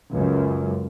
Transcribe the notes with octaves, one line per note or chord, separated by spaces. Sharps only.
C#2 F#2